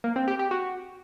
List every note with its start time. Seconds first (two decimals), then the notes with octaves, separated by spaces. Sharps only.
0.04 A#3
0.16 C4
0.28 G4
0.39 G4
0.51 F#4